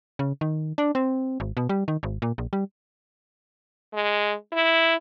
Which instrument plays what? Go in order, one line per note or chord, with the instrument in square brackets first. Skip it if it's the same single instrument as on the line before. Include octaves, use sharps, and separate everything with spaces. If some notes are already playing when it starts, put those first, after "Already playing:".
[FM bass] C#3
D#3
D4
C4
G#1
B2
G3
D#3
G#1
A#2
A#1
G3
[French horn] G#3
E4